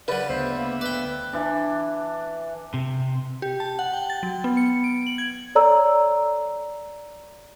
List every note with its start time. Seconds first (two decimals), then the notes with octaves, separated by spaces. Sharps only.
0.08 C#3 F#3 B4 D5
0.29 D2 B3 C5 E5
0.56 A#3
0.81 B4 D5 G5
1.33 E3 D4
2.74 C3
3.42 G4
3.60 A5
3.79 F#5
3.93 G5
4.10 A6
4.23 F#3
4.44 B3
4.57 C#7
4.84 D7
5.07 F#7
5.18 G#6
5.55 A4 C#5 D5 A#5 E6